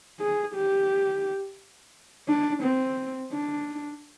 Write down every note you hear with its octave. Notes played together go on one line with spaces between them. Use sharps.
G#4
G4
D4
C4
D4